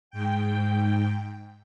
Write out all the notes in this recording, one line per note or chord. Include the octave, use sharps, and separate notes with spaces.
G#2 G5